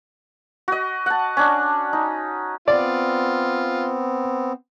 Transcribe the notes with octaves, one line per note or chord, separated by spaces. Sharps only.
F#4 D#5
F#5 A5
C#4 D4
D#4
B3 C4 F4 D5